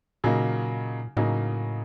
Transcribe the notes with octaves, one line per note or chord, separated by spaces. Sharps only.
A#2 C#3 F#3 A#3 D#4
A2 C#3 F#3 A#3 D#4